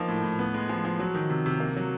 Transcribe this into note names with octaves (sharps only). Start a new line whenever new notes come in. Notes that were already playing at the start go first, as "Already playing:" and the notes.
Already playing: F3 A#3 D#4
A2
A2
B3
G#3
F3
F3
F#3
D#3
C3
C3
A#3
F#3